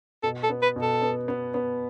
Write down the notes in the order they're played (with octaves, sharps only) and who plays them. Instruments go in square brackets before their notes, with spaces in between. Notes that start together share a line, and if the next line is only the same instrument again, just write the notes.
[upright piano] B2 [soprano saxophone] A4
[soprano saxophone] A4
[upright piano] B3
[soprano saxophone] B4
[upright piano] B2
[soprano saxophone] A4
[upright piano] B3
B3
B3